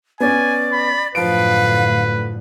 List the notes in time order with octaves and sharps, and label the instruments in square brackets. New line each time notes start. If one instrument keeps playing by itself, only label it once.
[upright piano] B3 C#4 [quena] D5 [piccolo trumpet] G#5
[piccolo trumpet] B5
[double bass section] F#2 A2 D3 [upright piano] F3 D7 [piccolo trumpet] B4 [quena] F5